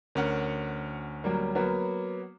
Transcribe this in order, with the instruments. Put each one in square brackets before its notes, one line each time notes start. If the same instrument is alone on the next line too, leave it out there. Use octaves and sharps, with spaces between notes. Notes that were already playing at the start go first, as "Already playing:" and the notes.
[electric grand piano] D2 C#4 F#5 [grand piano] A#4
[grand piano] F#3 G3 A#3
F#3 A#3 B3